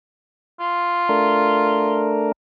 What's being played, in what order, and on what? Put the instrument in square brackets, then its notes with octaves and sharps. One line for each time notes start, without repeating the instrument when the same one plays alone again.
[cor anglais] F4
[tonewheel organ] A3 D4 A#4